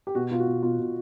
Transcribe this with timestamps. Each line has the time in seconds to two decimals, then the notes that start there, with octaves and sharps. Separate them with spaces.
0.07 G4
0.15 B2 F#4
0.31 B2 F4
0.39 F#4
0.47 B2
0.63 B2 F4
0.79 B2